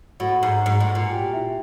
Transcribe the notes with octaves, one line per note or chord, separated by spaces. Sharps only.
A2 F#4 F#5
G#2
G#2
A2
A#2
G#5
G4 G5
E4 E5